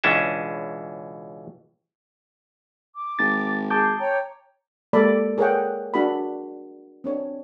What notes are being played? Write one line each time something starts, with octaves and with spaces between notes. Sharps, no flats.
C#2 B2 E3 C#4 D4 E5
D6
G#1 A6
G#4 A5 D6 G6
C#5 G5 A#5
G#3 A#3 G4 A4 D5 B5
G#4 A#4 B4 C#5 F#5 G5
D4 F#4 G#4 A#4 B5
C4 D4 C#5